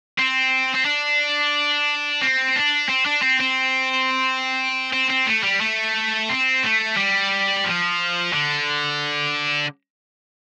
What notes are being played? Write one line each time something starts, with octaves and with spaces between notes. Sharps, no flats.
C4
C4
D4
C4
D4
C4
D4
C4
C4
C4
C4
A3
G3
A3
C4
A3
G3
F3
D3